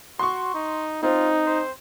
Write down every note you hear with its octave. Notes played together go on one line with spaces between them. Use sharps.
F#4 C6 C#6
D#4
C4 D#4 F4
C5